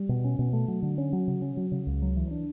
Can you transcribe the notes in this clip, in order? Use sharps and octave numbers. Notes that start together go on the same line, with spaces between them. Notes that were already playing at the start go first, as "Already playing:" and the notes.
Already playing: G3
B2
C#4
B2
A3
F#3
D3
C#4
F#3
C#3
C#4
F#3
C#3
C#2
F#3
E3
D4